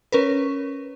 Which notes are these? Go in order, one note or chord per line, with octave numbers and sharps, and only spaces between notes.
C#4 A#4 B4